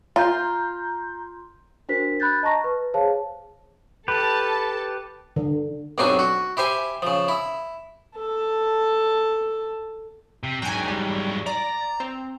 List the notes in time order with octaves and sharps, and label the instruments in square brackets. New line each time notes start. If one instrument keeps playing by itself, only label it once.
[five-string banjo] F4 [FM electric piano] A#5 C6 G6
[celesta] D4 F#4 A#4 C5 B6
B5 F#6 G6 A6
D#5 A5 A#5 C#6 A#6
B4
G#4 C5 C#5 F5 A5
[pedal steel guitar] G4 B4 [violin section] A4 A5
[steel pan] D3
[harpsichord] B1 G2 F#3 C4 D4 G#5
F#4
E4 G4 C5 G#5
C#3 F3
E4
[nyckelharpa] A4 A5
[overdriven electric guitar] C3
[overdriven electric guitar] G#2 F#3 [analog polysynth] G5 G#5
[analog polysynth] G3
[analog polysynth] D5 [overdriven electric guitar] A#5
[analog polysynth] C4